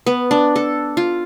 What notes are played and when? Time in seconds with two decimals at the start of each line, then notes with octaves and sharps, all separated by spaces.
0.06 B3
0.31 D4
0.56 A4
0.97 F4